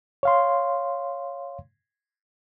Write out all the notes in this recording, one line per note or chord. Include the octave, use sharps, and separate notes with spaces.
C#5 F5 C6